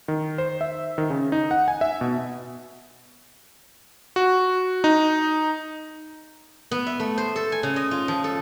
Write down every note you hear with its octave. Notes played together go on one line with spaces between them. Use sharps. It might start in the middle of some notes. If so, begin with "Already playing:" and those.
D#3
C5
E5
D#3
C#3
D#4
F#5
G#5
E5
B2
F#4
D#4
B3
E5
A3
C5
A4
G#5
C#3
D#5
F4
F3
A4